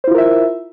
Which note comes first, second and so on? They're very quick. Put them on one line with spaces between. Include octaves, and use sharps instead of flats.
C5 E4 F4 A#4 E5